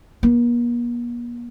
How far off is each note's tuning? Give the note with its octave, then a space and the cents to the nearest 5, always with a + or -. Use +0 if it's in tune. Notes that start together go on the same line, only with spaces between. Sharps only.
A#3 +45